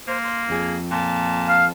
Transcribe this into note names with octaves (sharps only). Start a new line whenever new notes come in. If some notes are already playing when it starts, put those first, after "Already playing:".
A#3 C5
C6
F2 G#4
A#2 A5
F5